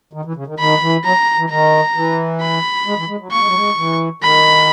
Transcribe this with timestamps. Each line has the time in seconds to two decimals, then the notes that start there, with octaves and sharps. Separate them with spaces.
0.13 D#3
0.25 E3
0.36 C#3
0.47 D#3
0.59 D#3 B5
0.81 E3
1.04 F#3 A#5
1.38 E3
1.49 D#3 A#5
1.95 E3
2.41 B5
2.86 G#3
2.97 E3
3.08 G#3
3.20 F#3
3.31 A#3 C#6
3.39 G#3
3.47 F#3
3.55 G#3
3.77 E3
4.22 D#3 B5